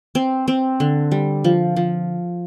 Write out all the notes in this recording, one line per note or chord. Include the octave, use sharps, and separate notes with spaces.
C4
C4
D3
G3
F3
F3